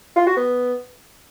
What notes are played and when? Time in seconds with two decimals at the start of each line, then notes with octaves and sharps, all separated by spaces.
0.17 F4
0.27 F#4
0.37 B3